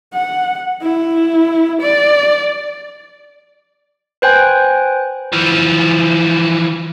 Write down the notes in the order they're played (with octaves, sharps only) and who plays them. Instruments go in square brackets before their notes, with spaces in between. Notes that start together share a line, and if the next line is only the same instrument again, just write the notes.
[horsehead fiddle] F#5
E4
D5
[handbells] B4 C5 G5 G#5
[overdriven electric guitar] E3 F3